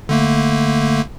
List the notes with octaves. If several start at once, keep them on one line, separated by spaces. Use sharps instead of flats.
D3 A3 A#3